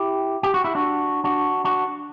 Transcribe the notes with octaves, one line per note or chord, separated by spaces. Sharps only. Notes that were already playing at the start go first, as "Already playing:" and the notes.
Already playing: E4 G4
G4
F#4
E4
D4 F#4
D4 F#4
D4 F#4